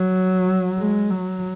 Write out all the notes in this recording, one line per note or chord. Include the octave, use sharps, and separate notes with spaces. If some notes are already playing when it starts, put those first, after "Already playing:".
Already playing: F#3
G#3
F#3